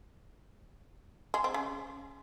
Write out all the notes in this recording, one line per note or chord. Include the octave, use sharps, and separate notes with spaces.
G#3
C4
C#3